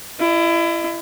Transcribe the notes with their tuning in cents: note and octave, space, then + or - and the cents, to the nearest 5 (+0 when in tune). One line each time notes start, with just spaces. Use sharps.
E4 +30 D#5 -20